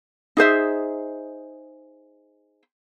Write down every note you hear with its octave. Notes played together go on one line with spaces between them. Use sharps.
D#4 G#4 C5 E5